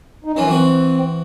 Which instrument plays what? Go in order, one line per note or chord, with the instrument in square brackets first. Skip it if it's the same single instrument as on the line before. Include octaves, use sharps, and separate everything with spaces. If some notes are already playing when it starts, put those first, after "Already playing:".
[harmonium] D#4
[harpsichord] F#2 E3 F4 [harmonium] C#4
[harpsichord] E3 F#4 [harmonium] C4